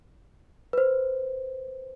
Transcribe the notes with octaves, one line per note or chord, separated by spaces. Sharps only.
B4 C5